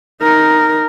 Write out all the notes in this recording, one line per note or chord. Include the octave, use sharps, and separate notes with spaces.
D#4 A#4